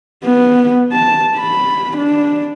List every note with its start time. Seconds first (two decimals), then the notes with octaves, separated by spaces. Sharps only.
0.25 B3
0.92 A5
1.38 B5
1.98 D4